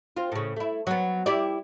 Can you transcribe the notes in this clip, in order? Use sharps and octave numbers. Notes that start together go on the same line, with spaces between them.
C4 F4
A2 C#3
A3 E4
F#3 B3
E4 G4 D5